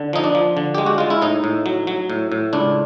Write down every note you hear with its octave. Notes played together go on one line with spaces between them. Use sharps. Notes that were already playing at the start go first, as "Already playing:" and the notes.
Already playing: D3
F3 D#4
D4
F3
D3
G#3 G4
F#4
G#3 F4
E4
A2 D#4
A2
F#3
F#3
A2
A2
C#2 D4